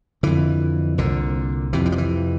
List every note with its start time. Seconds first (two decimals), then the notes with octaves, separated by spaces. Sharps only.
0.23 F2 D3 E3
0.98 C2 A#2 D3
1.73 F2 C3 E3
1.86 E3
1.92 F3
1.98 E3